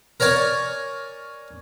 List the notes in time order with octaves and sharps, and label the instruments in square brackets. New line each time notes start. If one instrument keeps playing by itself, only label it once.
[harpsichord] A#4 C#5 D5 G#5